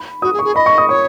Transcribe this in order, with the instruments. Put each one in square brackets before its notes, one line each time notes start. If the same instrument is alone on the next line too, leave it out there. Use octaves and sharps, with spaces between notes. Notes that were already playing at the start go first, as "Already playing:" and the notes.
Already playing: [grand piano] B5
[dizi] F#4 [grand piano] D#6
[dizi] G#4
[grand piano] C#6
[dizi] G#4
[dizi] D#5 [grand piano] B5
[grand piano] C#6
D#6
[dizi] C#5 [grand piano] C#6